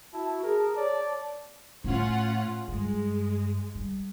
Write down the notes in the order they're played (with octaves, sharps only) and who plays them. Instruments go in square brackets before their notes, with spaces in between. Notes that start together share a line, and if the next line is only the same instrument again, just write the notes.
[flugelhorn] E4 [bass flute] F#4 [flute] A5
[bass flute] G#4 [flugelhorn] A#4
[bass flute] C#5 [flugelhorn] D5
[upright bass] A2 [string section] C#4 F4 F#5
[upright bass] G2 [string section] G#3
[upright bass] G3